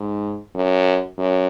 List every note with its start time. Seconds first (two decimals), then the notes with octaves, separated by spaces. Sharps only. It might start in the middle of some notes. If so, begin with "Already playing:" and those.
Already playing: G#2
0.55 F#2
1.18 F#2